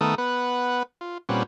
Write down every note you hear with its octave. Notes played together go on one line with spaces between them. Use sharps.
D#3 A3 B3 A4 A#4 D#6
B3 B4 F#5
F4
A#2 G3 C4 C#4 B4 F#5